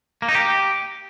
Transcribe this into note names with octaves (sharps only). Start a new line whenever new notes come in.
A#3
D#4
G4